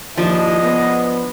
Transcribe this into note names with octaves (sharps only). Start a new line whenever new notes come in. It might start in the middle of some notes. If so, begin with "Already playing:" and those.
D#2 F3 G#3 D4 E4 D#5
B3